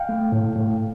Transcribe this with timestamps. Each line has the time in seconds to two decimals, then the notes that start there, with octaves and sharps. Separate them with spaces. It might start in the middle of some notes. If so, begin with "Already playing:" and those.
Already playing: F5 G5
0.09 A3
0.32 A2
0.56 A2